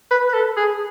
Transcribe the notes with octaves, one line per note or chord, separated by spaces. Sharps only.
B4
B4
A4
G#4